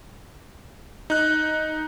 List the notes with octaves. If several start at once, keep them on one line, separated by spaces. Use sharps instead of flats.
D#4 F#6